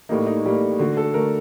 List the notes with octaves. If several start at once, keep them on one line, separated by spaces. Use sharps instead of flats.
A2 G3 A#3 D#4
D#4
A2 G3 A#3
D3 A3 F#4
A4
D3 A3 A#4